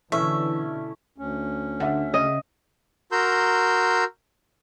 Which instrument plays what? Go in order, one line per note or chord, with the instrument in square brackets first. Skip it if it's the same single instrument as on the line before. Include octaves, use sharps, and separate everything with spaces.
[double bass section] B2 D3 [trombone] E3 [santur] A3 C#4 E4 [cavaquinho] E5
[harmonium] D2 C#4
[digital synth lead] D3 [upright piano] E5 F#5
[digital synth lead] C#3 [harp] D#5
[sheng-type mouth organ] F#4 A#4 A#5 C6 E6 G6